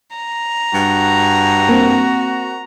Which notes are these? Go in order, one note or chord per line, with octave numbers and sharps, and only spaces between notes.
A#5
G2 F#4
A#3 C4